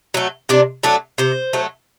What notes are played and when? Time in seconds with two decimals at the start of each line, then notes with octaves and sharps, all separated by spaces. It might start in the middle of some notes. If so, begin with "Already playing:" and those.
0.14 F#3 A3
0.49 C3 D4
0.83 F#3 A3 D4
1.18 C3 C5
1.53 F#3 A3